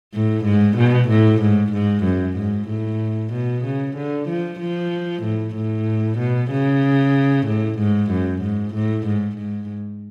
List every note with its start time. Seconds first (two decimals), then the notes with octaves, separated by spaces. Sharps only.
0.14 A2
0.45 G#2
0.77 B2
1.09 A2
1.41 G#2
1.73 G#2
2.04 F#2
2.37 G#2
2.68 A2
3.33 B2
3.64 C#3
3.96 D3
4.28 F3
4.60 F3
5.23 A2
5.55 A2
6.18 B2
6.51 C#3
7.47 A2
7.78 G#2
8.11 F#2
8.42 G#2
8.74 A2
9.07 G#2
9.37 G#2